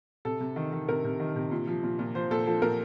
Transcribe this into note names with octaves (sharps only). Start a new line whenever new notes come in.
C3 A4
C3
D#3
D#3
C3 A#4
C3
D#3
C3
A#2
F3
A#2
A#2
F3 C5
A#2 A4
F3 A4
A#2 A#4